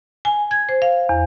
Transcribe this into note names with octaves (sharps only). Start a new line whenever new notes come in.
G#5
G#6
C5
F5
E2